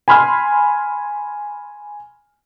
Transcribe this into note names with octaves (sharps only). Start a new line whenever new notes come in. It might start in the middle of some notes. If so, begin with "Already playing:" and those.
G#5 B5 C6 F6